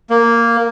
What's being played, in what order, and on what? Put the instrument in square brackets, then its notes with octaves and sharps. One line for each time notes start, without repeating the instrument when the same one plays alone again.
[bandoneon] A#3